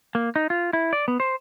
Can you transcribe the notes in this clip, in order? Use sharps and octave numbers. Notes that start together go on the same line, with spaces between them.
A#3
D#4
F4
E4
D5
B3
C5